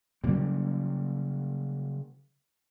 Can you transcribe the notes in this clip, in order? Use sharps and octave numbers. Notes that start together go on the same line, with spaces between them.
C#3 F#3 G3 A#3